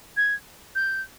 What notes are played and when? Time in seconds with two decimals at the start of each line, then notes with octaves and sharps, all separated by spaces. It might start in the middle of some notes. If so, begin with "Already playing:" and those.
0.17 G#6
0.75 G6